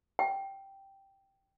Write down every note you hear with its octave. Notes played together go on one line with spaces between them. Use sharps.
G5